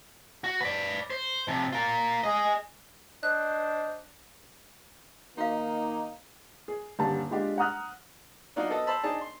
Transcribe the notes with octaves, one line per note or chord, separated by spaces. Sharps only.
F#4
B4 D5
C5
C3 F3
F4 A#4
G#4 D#5
D4 C5 D#5 F#6
D#3 A#3 D#4 F#4 F5
G#4
D#1 G2 D3 A5
G#3 D4 F4 G4
F#5 A#5 D#6 F6 F#6
F#3 D4 D#4 F4 F#4 D5
B3 A4 D#5
C5 A5 B5 E6
D4 D#4 G#4 A5
C6